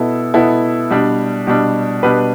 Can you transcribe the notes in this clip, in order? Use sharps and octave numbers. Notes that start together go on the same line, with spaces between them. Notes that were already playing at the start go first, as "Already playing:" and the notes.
Already playing: B2 B3 E4 A4
B2 B3 E4 A4
B2 G3 D4
B2 G3 D4
B2 G3 D4 B4